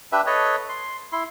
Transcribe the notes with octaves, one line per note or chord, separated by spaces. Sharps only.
D4 G4 B4 E5
A4 B4 C#5 D#5
C6
E4 C6